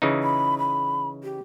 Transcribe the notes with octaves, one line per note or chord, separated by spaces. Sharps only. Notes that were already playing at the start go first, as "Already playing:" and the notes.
C#3 E3 D#4
B5
B5
G4